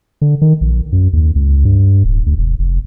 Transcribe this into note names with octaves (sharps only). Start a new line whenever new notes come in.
D3
D#3
A#1
F#2
D#2
C#2
G2
D1
D2
E1
F1